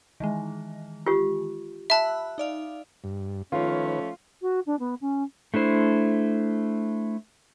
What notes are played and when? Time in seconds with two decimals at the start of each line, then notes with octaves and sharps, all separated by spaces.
0.20 D#3 E3 G#3
1.06 F4 G4
1.90 E5 A5 B5 E6 F#6
2.38 D#4 D5 F5
3.04 G2
3.52 D#3 F3 A3 C#4 F4 B4 C#5
4.41 F#4
4.66 D4
4.79 B3
5.01 C#4
5.54 A3 D4 E4 C5